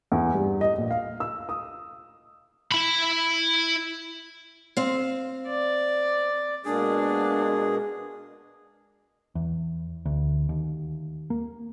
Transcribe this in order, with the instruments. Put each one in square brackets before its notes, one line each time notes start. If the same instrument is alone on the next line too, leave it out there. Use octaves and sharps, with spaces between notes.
[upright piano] E2
G2
D#5
A#1
F5
E6
D#6
[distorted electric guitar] E4 B5
[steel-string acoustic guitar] C4 F5
[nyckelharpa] D5
[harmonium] B2 G#3 A#3 [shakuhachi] D4 [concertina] G#4
[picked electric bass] E2
D2
D#2
A#3